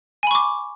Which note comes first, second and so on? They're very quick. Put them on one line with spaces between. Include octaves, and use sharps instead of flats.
G#5 B5 C#6 D6